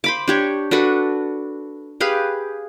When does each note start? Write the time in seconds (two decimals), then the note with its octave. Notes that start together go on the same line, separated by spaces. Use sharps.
0.04 C5 B5 D6
0.28 D4 G4 C#5
0.71 D4 F#4 A4 B4
2.00 G4 G#4 B4 F5